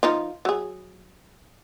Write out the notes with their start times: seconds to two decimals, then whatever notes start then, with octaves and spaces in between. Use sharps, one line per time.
0.03 F3 D#4 F4
0.45 F#3 G#4